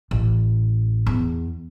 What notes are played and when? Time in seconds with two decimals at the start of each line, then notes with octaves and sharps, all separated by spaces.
0.11 A1
1.07 E2